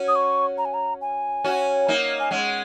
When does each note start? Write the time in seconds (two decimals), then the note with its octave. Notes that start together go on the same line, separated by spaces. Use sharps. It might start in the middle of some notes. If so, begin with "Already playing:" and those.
Already playing: C#4 F#4
0.08 D#6
0.16 C#6
0.58 A#5
0.65 G#5
0.74 A#5
1.01 G#5
1.44 C#4 F#4
1.88 A#3 D#4
2.20 G#5
2.31 G#3 C#4 F#5